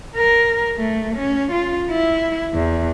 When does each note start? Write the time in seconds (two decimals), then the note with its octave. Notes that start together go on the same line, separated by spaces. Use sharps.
0.16 A#4
0.78 A3
1.15 C#4
1.51 F4
1.91 E4
2.54 E2